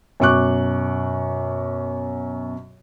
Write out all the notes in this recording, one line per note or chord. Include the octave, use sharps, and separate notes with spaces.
F#2 B2 C#6 D6 F#6